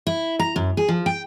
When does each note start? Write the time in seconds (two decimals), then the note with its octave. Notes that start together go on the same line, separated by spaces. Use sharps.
0.07 E4
0.39 A#5
0.56 F#2
0.77 G#4
0.88 F3
1.06 G5